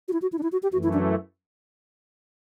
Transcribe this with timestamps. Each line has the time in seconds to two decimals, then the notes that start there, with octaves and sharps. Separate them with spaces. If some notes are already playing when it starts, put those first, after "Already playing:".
0.08 F#4
0.13 E4
0.22 F#4
0.33 E4
0.39 D4
0.43 E4
0.52 F#4
0.63 G4
0.72 F#2 E3 A3 F#4
0.83 E4
0.93 D4